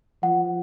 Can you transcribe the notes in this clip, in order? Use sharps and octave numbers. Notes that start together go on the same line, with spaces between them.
F3 F#5